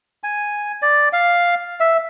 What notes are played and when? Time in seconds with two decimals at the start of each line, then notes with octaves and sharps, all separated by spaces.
0.24 G#5
0.82 D5
1.13 F5
1.80 E5